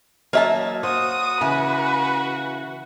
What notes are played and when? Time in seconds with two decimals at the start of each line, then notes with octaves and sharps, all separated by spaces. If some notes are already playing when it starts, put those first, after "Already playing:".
0.33 F#3 A#3 C#5 D#5 E5 A5
0.83 F#4 C5 D#6
1.41 C#3 E3 B4